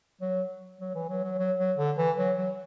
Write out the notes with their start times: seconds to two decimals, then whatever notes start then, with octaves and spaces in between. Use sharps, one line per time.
0.21 F#3
0.81 F#3
0.95 E3
1.09 F#3
1.24 F#3
1.38 F#3
1.58 F#3
1.78 D3
1.98 E3
2.17 F#3
2.37 F#3